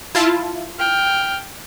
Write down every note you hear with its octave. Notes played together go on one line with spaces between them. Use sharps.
E4 F4 A5
G5 F6